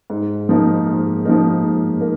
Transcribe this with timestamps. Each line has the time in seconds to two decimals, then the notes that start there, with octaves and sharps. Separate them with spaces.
0.10 G#2
0.49 F3 A#3 D#4 A#4
0.87 G#2
1.25 F3 A#3 D#4 A#4
1.63 G#2
2.01 A#3 D#4 A#4